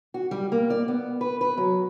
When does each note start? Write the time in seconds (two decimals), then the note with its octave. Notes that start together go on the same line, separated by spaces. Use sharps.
0.14 F#4
0.31 G3
0.52 A#3
0.70 D5
0.88 B3
1.21 B4
1.41 B4
1.57 F#3